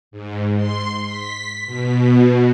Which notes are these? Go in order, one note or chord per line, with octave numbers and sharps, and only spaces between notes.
G#2
C6
B6
B2